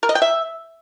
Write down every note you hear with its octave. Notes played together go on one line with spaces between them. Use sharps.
A#4
D#5
G5
E5